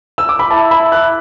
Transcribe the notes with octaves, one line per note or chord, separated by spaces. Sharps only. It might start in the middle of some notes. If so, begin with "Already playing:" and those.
E6
D6
B5
E4 A5
B5
F#6